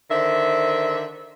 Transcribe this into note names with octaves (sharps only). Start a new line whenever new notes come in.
D3 D#3 C5 E5